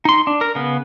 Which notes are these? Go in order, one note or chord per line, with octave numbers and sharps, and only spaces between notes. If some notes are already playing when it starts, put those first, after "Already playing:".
D#4 C6
D4
A#4
C#3 B3